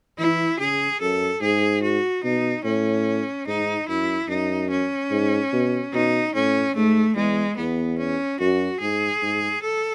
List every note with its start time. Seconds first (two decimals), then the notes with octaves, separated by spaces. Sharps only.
0.18 E3 E4
0.59 C#3 G#4
1.01 F#2 A4
1.41 G#2 G#4
1.83 F#4
2.24 B2 D#4
2.65 A2 C#4
3.47 G#2 D#4
3.88 F#2 E4
4.29 F#2 D#4
4.71 C#4
5.11 G#2
5.53 B2
5.93 B2 D#4
6.35 A2 C#4
6.76 G#2 A3
7.16 E2 G#3
7.58 E2 B3
7.99 C#4
8.40 F#2 F#4
8.81 G#2 G#4
9.22 G#2
9.63 A4